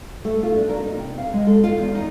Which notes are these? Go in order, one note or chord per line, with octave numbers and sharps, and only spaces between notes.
A3
F4
D4
A#4
D#4
C3
F5
G#3
A4
F4
E2
D#4